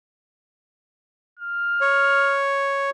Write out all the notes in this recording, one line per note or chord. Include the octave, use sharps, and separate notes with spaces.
F6
C#5